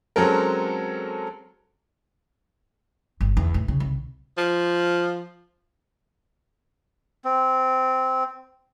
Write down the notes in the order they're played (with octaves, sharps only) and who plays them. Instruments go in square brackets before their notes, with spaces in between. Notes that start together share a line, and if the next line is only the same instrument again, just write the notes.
[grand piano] F#3 G#3 C4 C#4 A4 A#4
[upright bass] G1
E2
A2
C#3
C2
[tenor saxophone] F3
[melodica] C4